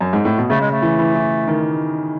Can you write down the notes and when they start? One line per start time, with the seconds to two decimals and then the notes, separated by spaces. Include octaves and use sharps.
0.01 F#2
0.13 G#2
0.25 A2
0.38 B2
0.49 C#3 A3
0.61 G#3
0.71 A3
0.82 E3
0.99 E3
1.15 E3
1.48 D#3